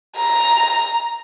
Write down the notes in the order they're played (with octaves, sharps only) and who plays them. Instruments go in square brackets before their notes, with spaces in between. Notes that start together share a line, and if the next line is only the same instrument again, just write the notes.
[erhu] A#5